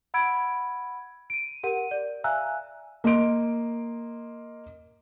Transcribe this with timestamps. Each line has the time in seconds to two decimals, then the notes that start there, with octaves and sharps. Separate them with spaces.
0.14 F#5 B5 E6 G#6 D7
1.30 D7 D#7
1.63 G4 A#4 F#5 D#7
1.91 D5
2.24 E5 F5 G#5 A#5 E6 F#6
3.04 A#3 D#5 C6 D7